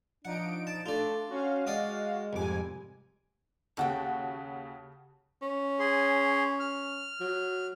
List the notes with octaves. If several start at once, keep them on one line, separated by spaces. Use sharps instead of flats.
F3 D4 D#4 F#5 D7
A5
A3 D4 F4 A4 D5
C#4 F#4 F5
G#3 D5 D#5 D#6
C2 F2 G#2 G#5 D6
D#2 C#3 F#4 A4 F#5 G5
C#4
G#4 C6
F6
F#3